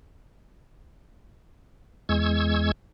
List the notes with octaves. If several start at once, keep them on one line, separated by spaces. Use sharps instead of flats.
E2 G#3 C#6 E6 G#6